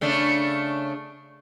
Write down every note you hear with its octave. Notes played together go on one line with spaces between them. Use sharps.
C#3 A3 D4